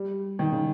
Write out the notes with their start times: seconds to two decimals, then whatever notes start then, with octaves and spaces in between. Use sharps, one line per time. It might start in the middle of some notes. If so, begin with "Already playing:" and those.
Already playing: G3
0.39 D#3
0.52 C#3